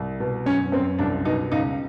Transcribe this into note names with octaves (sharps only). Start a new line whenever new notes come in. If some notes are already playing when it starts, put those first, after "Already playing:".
Already playing: C2
B2
F#2 C#4
F#2 C4
C2 D4
B2 D#4
C#2 D#4